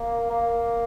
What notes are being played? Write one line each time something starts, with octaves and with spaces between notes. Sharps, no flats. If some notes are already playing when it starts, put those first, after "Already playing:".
Already playing: A#3
A#3